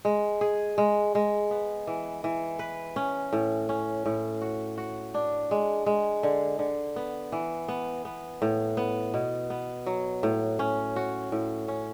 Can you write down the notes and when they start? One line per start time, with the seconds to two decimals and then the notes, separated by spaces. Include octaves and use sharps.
0.05 G#3
0.41 G#4
0.78 G#3
1.15 G#3
1.51 B3
1.87 E3
2.24 E3
2.59 B4
2.96 C#4
3.33 A2
3.69 C#4
4.06 A2
4.41 F#4
4.78 F#4
5.14 D4
5.51 G#3
5.86 G#3
6.23 D3
6.59 D3
6.96 B3
7.32 E3
7.68 B3
8.05 B3
8.42 A2
8.77 B3
9.14 B2
9.50 B3
9.86 F#3
10.23 A2
10.59 C#4
10.96 F#4
11.32 A2
11.68 C#4